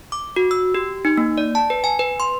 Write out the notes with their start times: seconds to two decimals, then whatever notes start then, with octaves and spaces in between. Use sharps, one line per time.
0.12 D6
0.36 F#4
0.51 E6
0.74 G4
1.05 D#4
1.17 A#3
1.38 D5
1.55 A5
1.70 B4
1.84 G#5
1.99 B4
2.20 C6